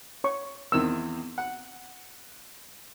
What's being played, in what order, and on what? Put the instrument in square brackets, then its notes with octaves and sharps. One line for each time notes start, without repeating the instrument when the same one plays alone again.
[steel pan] C#5 C#6
[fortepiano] E2 D#3 C4 [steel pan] E6
[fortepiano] F#5